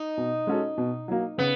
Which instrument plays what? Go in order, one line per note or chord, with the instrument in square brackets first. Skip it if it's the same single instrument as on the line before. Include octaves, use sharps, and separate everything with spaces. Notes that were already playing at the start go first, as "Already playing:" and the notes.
Already playing: [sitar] D#4
[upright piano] B2
G#3 C#4 F#4 A4
B2
F#3 A#3
[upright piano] C#3 [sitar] B3